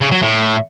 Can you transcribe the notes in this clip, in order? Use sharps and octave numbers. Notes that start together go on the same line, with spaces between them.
C#3
F#3
A2